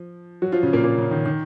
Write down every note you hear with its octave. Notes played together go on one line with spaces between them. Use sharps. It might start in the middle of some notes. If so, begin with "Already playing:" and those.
Already playing: F3
F#3 F#4
F3 F4
C#3 C#4
A#2 A#3
A#2 A#3
C#3
D#3
D#3